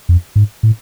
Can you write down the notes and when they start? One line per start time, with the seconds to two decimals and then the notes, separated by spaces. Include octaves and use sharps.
0.09 F2
0.36 G#2
0.63 A2